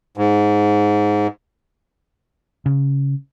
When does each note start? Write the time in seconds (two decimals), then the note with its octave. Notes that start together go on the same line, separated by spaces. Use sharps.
0.17 G#2
2.66 C#3